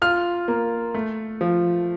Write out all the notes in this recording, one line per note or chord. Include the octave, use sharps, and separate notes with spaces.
F4 F6
A#3
A3
F3